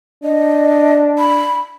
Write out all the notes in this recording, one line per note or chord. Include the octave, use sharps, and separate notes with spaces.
D4 D#5
B5